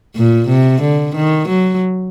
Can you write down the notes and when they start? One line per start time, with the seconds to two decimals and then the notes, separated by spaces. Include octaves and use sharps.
0.16 A#2
0.48 C3
0.82 D3
1.16 D#3
1.49 F#3